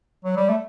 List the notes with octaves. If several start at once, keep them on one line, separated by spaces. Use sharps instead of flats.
F#3
G3
A3